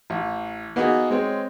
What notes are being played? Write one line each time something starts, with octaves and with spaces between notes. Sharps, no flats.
A1
A#3 B3 D#4 F#4 G#4
G#3 C4 C#5